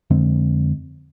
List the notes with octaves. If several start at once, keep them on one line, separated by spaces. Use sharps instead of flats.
F2 D3 G#3 C4